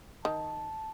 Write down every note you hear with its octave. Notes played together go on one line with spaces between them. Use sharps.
D#3 A5